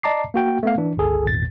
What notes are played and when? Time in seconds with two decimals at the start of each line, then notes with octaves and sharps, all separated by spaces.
0.03 D5 D#5 A5 A#5 D6 C7
0.34 A#3 F#4 G5
0.63 A3 B3 F5
0.78 E3 D4
0.97 G1 C#2 G#4 A4
1.26 G#1 E2 A#2 A6